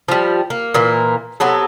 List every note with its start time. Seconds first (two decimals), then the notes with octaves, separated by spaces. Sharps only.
0.08 F3 G3
0.50 A#3
0.74 A#2 E3 A#3
1.40 C3 F#3 B3 A4